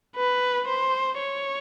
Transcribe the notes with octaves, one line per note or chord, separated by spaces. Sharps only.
B4
C5
C#5